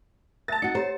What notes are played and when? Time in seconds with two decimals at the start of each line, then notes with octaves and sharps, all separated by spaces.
0.48 A#4 E5 A5 A6
0.62 D#4 F#4 C#7
0.75 G4 C5 C#5 A#5